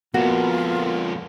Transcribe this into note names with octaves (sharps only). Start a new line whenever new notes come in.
F2 A#2 A#3 B3 F4 F#4